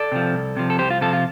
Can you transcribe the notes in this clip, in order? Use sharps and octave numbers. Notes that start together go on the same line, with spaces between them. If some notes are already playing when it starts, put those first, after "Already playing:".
Already playing: A4 D5
C3 F3
C2
C3 F3
A4
C2 G4 C5
F4
C3 F3 F4 A4
F4